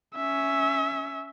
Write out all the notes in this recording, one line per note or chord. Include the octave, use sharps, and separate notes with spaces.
C#4 E5